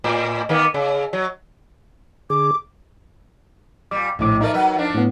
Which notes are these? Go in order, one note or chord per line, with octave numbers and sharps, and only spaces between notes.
A2
D#3 A#3 B3
C#3
F#3
D3 G#4 D6
A#2 G3 D6
A#1 F#2 A2 C3 D#3 D6
F3 A3 D#4 A#4 D5
F#3 B4
F3 D4
A2 B3